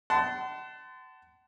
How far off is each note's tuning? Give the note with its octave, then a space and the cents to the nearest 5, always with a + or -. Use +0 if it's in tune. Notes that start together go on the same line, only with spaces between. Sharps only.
F#5 +35 A5 +0 C6 -30